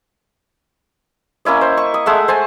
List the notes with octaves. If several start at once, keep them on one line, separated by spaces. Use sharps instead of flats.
A#3 C#4 E4 D#5
C5
C#6
D#6
G#3 A3 E5 F#5
C5 G#5 A5